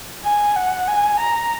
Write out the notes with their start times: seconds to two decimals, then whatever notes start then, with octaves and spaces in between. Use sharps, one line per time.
0.24 G#5
0.56 F#5
0.88 G#5
1.20 A#5